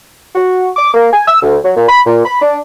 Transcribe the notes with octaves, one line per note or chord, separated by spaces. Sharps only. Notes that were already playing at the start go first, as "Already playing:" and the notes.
F#4
D6
A#3
G#5
E6
D2
F#3
A#2
B5
A#2
B5
D4